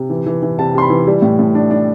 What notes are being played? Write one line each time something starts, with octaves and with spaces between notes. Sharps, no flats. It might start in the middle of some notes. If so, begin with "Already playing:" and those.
Already playing: C3
E3
E3
E3
C3 A5
C3 C6
B5
E3
G3
A2
A2
D4
D4